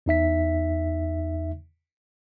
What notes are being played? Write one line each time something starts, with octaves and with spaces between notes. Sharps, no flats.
E2 D#4 E5 B6